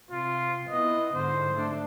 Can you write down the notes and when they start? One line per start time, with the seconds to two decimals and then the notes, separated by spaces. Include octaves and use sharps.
0.11 C3 F4
0.70 B3 E4 D#5
1.14 G#2 D3 C5
1.54 A3 D4